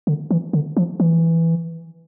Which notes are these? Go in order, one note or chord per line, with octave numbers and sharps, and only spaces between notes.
D3
E3
D3
F3
E3